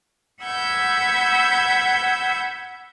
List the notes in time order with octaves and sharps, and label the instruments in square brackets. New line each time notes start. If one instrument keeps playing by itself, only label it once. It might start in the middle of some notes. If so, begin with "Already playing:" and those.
[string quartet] F#5 B5 E6 G6 G#6